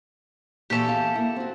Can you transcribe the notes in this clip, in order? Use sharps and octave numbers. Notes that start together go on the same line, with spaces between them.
A#2 E3 G4 A4 C#5
E2 F5
A#3 E4
C4 F#4